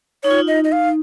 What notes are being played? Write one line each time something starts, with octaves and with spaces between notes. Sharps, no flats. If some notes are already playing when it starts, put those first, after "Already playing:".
D#4 C#5
F4
D#4
D#5
D#5
F5